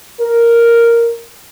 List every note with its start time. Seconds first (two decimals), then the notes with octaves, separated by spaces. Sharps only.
0.19 A#4